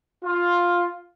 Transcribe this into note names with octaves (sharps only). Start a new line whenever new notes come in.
F4